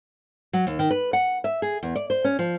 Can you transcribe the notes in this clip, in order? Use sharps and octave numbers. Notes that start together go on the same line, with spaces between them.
F#3
D#2
D#3
B4
F#5
E5
G#4
E2
D5
C5
C#4
F3